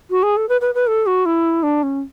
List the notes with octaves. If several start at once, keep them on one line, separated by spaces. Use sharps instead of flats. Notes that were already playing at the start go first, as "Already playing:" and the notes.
F#4
G#4
A4
B4
B4
B4
A4
F#4
E4
D4
C#4